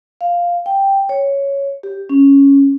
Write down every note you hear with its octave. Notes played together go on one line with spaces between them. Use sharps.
F5
G5
C#5
G4
C#4